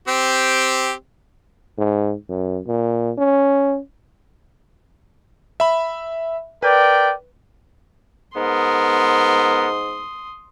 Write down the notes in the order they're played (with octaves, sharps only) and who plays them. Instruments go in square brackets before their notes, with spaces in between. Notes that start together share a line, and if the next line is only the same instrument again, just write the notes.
[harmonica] C4 G4
[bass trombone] G#2
F#2
A#2
C#4
[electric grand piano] E5 B5
[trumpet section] A#4 D5 G5 [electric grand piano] B4
[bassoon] G#2 [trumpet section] B3 A#4 [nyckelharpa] C6 D#6